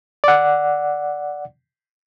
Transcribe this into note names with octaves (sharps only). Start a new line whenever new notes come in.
D5 F#5